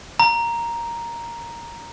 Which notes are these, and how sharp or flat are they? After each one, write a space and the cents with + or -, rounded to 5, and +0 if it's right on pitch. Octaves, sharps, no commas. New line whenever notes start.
A#5 +0